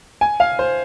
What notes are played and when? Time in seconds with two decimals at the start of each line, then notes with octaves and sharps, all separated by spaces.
0.21 G#5
0.40 F5
0.59 C5